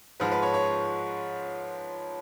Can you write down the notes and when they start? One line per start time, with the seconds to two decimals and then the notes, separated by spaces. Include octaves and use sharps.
0.20 G#2 F3 G#3 B4
0.31 B4
0.42 C#5
0.54 C#5